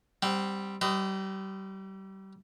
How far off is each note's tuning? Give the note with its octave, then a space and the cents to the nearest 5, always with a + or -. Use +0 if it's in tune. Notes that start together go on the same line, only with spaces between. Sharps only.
G3 +0 C4 +0 F#5 +35
G3 -30 B4 +40 D#5 +0